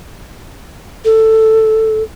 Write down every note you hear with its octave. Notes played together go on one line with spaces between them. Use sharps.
A4